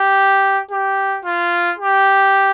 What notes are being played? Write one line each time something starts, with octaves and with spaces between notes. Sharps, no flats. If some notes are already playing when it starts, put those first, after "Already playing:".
Already playing: G4
G4
F4
G4